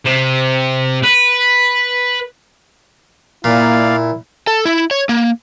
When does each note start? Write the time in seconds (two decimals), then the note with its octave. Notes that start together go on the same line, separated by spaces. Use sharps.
0.05 C3
1.03 B4
3.44 A#2 A#3 E4 D5 F5
4.47 A4
4.66 E4
4.91 C#5
5.09 A#3